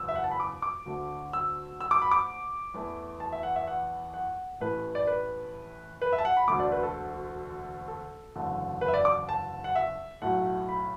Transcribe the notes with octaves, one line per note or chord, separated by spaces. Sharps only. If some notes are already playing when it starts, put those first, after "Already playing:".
Already playing: F#1 E2 E6
E5
F#5
A5
B5
D6
D6
D2 D3 A3
E6
E6
D6
B5
D6
E2 E3 A3
A5
E5
F#5
E5
F#5
F#5
A1 A2 E3 A3 B4
D5
B4
B4
E5
A5
F#5
B5
E1 D2 D3 A3 D6
D5
B4
A4
A4
F#1 E2 D3 A3
B4
E5
D5
D6
A5
F#5
E5
B1 A2 F#3 A3 F#5
B5